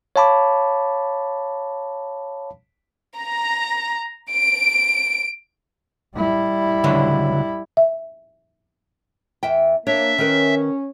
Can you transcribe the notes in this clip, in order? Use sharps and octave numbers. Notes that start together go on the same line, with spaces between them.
C#5 F5 A5 B5 D6
A#5
D7
G3 E4
C#2 D3 F#3
E5
E2 E5 G5
A#3 D4 C#5 E5
D#3 C#4 A#4 B4